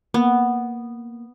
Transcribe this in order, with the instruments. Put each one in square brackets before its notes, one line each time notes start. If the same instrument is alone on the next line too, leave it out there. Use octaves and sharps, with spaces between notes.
[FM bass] A#3 [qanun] B3